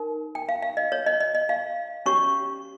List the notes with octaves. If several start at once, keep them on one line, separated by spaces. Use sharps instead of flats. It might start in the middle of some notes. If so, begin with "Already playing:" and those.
Already playing: D#4 A#4
G5
F5
F5
D#5
C#5
D#5
D#5
D#5
F5
C#4 G4 C#5 C#6